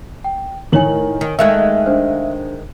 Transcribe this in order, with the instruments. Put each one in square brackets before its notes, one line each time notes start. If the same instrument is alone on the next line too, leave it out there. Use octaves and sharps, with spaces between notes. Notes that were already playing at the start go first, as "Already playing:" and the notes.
[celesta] G5
[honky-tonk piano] A2 D#3 F#7 [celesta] A#4 C#5 G#5
[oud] D#3
[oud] D#3 G#3 A3 [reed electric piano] E5 [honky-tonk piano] F5 F#6
[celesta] D4 C5